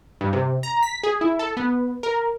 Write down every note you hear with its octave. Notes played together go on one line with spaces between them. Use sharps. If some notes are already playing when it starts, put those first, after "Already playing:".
G2
C3
A#5
B6
G#4
E4
A4
B3
A#4